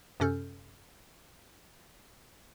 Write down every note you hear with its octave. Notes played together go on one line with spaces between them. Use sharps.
F#2 C3 C#4 A4 F6 G6